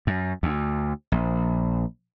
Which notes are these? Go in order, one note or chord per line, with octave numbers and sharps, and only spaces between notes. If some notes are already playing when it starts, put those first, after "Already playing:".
F#2
D2
A#1